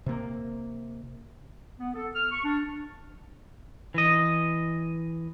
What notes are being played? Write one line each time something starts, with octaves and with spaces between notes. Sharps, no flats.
C3 A#3
B3
A4
F6
C#6
D4
E3 D#5